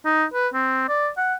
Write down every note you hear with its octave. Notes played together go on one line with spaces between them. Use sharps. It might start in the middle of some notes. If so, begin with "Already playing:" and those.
D#4
B4
C4
D5
F#5